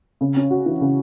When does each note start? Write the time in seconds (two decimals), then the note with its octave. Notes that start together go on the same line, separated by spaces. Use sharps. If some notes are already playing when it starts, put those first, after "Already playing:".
0.21 C#3
0.36 C#4
0.51 F#4
0.66 E3
0.81 C#3